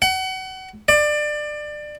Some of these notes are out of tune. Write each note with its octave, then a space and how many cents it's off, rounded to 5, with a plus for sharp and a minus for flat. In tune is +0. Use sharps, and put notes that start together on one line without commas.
F#5 +30
D5 +25